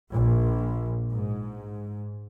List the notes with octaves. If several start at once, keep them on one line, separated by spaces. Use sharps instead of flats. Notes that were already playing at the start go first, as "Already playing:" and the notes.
A#1
G#2